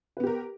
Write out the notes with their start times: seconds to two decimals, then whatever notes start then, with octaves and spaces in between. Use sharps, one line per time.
0.17 B4
0.20 B3
0.23 G4
0.27 A#4